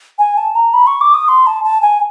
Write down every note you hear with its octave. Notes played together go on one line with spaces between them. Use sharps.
G#5
A5
A#5
B5
C#6
D6
D#6
C6
A5
A5
G#5